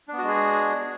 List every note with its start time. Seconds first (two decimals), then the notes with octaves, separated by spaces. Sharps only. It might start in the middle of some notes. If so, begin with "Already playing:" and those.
0.08 D4
0.13 B3
0.18 F#4
0.23 G#3
0.28 G#4